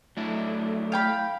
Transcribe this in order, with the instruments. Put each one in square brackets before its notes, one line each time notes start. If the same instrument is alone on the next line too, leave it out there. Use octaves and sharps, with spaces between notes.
[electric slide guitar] F#3 D4 E4 [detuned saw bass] A3
[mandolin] F5 G5 B5